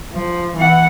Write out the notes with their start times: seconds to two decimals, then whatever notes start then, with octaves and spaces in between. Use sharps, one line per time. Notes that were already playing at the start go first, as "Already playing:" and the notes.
0.13 F3
0.57 E3 F#5